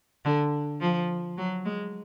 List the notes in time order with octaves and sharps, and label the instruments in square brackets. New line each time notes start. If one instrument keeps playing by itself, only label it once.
[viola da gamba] D3
F3
F#3
G#3